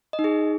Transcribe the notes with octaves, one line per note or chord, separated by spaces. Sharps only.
D#5
D#4
G#4